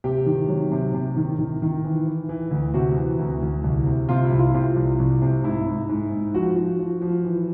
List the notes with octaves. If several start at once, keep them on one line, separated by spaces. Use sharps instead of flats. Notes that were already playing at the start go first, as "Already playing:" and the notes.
C3 G4
D#3
F#3
C3
C3
D#3
D#3
D#3
E3
E3
E3
D2
C3 F#4
E3
D2
D2
C2
C3
C3 F4
E4
C2
F4
C3 F4
C2
C2
C3
G#2 E4
G#2
G#2
G#2
F3 F#4
F3
F3
F3
E3